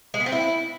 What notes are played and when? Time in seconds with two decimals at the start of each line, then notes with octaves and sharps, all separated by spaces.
0.14 G#3
0.20 B3
0.26 C4
0.32 E4